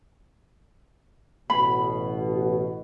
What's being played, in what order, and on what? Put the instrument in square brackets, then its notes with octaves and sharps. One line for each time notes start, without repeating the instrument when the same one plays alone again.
[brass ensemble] A1 B2 [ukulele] B5